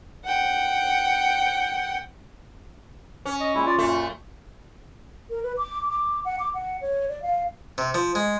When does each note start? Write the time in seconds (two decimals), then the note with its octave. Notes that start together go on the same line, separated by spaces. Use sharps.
0.25 F#5 G5
3.26 C#4
3.40 D#5
3.55 A#2 G#3 E4
3.66 F4 D5
3.78 F#2 A#2 A3
5.30 A#4
5.43 B4
5.57 D6
5.89 D6
6.25 F#5
6.39 D6
6.54 F#5
6.81 C#5
7.09 D5
7.22 F5
7.78 C3
7.94 F3
8.15 G#3